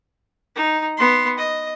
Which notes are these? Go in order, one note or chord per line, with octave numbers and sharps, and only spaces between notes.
D#4
B3 C6
D#5